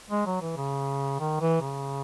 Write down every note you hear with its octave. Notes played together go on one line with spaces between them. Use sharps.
G#3
F#3
E3
C#3
D#3
E3
C#3